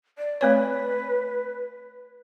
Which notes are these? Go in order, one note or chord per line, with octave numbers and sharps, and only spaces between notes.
D5
A3 C4 B4 C#5